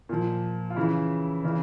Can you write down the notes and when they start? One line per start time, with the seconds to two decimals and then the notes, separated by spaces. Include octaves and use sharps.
0.09 A#2 F3
0.70 F4
0.76 C#3 E3 E4
1.44 C#3 E3